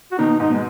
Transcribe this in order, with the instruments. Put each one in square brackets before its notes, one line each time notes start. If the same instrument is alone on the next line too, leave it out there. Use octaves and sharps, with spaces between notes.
[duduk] F#4
[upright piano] B2 D#3 [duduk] D#4
[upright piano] B2
[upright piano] G#2 [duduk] D#4
[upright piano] B2 [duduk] G#3